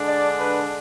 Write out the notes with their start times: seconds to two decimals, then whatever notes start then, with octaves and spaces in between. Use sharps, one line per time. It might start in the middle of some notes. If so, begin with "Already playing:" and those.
Already playing: D3 G#3 D4
0.09 D5
0.38 B4